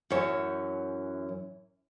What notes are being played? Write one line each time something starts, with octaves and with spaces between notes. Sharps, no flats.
F#2 E3 C#5